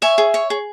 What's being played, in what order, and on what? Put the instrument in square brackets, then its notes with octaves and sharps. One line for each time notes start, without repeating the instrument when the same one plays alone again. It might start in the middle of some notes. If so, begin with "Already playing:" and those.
[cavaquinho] C#5 E5 G#5
G#4
C#5
G#4